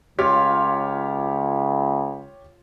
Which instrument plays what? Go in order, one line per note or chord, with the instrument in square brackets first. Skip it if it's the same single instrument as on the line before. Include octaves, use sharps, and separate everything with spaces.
[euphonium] C#2 [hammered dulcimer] F4 [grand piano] G4 C#5